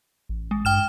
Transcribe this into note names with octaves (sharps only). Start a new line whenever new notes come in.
A1
G#3
G2 G5 F6 E7